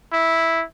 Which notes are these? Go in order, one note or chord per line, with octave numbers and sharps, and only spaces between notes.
E4